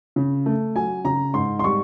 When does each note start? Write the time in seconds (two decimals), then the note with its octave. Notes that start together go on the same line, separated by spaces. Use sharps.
0.16 C#3
0.46 A3
0.75 F#3 G#5
1.05 C#3 A#5
1.34 G#2 C6
1.59 C6
1.64 G3 C#6